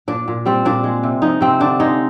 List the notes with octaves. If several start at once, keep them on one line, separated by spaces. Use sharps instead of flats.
A#2 D4
A#2
G3 C4
A#2 D4
G#3
C3
F3 D#4
C3 C4
D3 D4
G#3 D#4